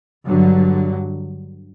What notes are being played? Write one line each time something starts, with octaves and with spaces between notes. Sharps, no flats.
G2 D3 F#3